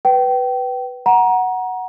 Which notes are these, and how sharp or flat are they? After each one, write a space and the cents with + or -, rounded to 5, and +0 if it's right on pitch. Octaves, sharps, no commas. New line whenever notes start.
B4 +0 G5 -25
F#5 +0 A#5 +20